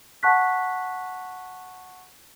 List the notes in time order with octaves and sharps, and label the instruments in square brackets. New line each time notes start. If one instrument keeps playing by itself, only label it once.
[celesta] F#5 A5 C#6 F#6 B6